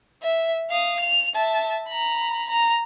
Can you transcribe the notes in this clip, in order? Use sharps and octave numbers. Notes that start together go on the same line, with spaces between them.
E5
F5 D#6
F7
E5 A5
A#5 B5
A#5